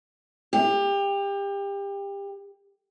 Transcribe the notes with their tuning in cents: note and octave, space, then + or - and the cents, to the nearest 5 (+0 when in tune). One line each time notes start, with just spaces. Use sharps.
G4 +25